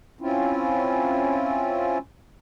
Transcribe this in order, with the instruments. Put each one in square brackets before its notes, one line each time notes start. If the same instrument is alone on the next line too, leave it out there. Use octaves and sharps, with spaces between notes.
[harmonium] C4 C#4 E4 F4